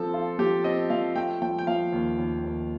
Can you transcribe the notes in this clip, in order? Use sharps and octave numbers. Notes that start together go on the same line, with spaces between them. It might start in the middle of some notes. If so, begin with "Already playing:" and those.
Already playing: F3 C4 A4
F4
F3 G4
C4 D#5
F3 F5
A3 G5
F3 G5
G5
F3 F5
D#2
D#2
D#2